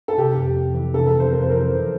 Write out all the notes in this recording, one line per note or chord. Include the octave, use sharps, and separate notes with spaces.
A4
C3 G4
F2
F2
E3
C3 A4
A4
F2
C5
F2 A#4
C5
E3 A#4
F3